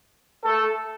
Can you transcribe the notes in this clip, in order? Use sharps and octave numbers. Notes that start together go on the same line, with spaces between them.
A3 A4